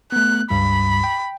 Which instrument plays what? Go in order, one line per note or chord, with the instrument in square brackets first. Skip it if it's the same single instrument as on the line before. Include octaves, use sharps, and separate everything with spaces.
[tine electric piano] A3 B3 [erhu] F#6
[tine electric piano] C#2 G2 G3 [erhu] B5
[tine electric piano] G5